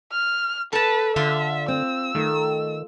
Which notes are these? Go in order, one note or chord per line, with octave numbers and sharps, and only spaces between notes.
F6
A4 B4 A5
D3 F4 E5
C4 E6
D#3 A3